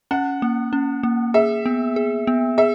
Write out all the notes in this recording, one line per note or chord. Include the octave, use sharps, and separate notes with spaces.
C#4 F#5
A#3
C#4
A#3
G#4 E5
B3
G#4
B3
G#4 E5